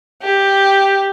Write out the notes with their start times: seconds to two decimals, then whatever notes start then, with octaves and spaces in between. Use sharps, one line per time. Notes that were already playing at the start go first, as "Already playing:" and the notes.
0.22 G4